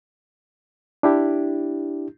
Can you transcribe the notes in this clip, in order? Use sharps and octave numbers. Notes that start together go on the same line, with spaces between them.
D4 E4 G4